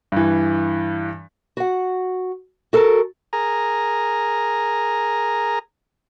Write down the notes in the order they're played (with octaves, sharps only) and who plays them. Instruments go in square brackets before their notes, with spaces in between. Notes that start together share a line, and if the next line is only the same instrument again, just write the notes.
[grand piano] G2 E3
[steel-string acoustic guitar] F#4 F#5
F#4 A4 A#4
[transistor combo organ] G#4 A#4 A#5